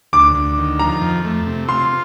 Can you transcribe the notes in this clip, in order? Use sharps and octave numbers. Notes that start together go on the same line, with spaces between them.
D2 D6
D2
D#3
F3 A#5
F2
A3
C3
F4 C6